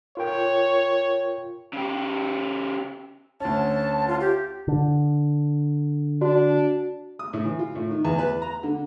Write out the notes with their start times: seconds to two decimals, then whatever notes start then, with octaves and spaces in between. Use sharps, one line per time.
0.17 F4 A#4 C#5 G5
1.73 C#3 G4
3.40 D2 C#4 A5
4.08 F4
4.20 G4
4.68 D3
6.21 D4 F#4
7.19 D#6
7.33 A2
7.45 E3
7.59 F4
7.75 A2
7.91 D#3
8.05 E2
8.19 B4
8.42 A#5
8.63 D3